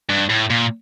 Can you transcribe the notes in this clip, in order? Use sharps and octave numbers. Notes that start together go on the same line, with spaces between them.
G2
A2
A#2